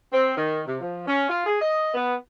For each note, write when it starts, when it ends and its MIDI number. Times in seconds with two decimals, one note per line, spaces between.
0.12 0.35 60
0.36 0.61 51
0.66 0.76 48
0.80 1.05 53
1.06 1.28 61
1.29 1.42 65
1.45 1.59 68
1.61 1.92 75
1.94 2.14 59